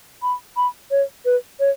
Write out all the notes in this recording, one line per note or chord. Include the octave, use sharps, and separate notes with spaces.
B5
B5
C#5
B4
C#5